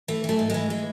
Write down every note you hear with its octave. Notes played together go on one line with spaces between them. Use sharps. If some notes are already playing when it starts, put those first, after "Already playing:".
E3 A3
E3 A3
G#2
E3 G#3
G#3